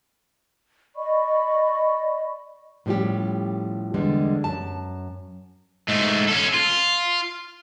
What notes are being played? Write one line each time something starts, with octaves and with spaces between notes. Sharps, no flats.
D5 D#5 B5 C#6
A2 F3 G3 C#4 G4
E2 D3 G3 G#3
F#2 A5
G#2 A3
C#4 A4
F4